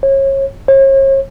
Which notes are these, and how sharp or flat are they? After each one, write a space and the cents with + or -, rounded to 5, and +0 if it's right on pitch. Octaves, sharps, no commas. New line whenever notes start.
C#5 -30
C#5 -40